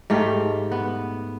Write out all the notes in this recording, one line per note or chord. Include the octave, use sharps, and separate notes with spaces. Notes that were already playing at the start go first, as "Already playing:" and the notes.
G#2 A3 G4 F5
B3